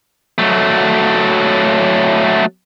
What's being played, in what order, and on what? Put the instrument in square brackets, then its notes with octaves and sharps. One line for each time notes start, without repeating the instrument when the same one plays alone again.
[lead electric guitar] F#3 A3